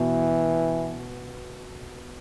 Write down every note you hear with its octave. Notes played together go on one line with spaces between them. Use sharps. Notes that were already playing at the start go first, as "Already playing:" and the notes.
Already playing: B2 E3